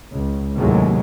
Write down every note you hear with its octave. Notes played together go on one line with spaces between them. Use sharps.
C#2
A1 D#2 A2 C3 F#3 G#3